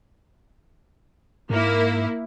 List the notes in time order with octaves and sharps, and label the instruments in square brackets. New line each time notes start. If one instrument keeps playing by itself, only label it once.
[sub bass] G#2 [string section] A#3 E4